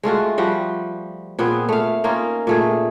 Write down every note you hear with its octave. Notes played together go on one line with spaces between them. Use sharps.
G#3 A3 F4 F#4
F3 G3 F#4
A#2 B3 C4 G#4
A3 F5
A#3 C#4 D#4 F4
A#2 A3 G#4